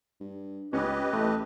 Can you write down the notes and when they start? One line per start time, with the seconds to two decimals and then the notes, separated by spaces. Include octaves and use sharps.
0.20 G2
0.73 C#2 C#4 G4 B4 D#5
1.13 A1 A3